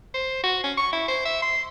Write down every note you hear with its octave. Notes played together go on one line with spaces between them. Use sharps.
C5
F#4
C#4
C#6
E4
C5
E5
C6